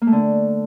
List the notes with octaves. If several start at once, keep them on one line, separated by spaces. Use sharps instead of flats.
A#3
A3
D3